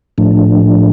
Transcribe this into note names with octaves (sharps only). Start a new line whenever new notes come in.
A2 F3 A3 D4